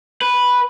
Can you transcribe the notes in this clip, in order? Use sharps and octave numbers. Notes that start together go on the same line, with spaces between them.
B4